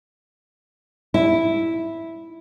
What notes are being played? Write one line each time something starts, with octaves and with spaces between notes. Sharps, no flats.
E4